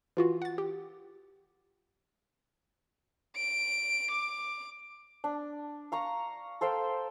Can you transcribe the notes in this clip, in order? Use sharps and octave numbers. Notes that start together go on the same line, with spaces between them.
E3 F4 F#4
F#5 A6
G4
D7
D6
D4
F5 A#5 C#6
A4 C5 F5 G5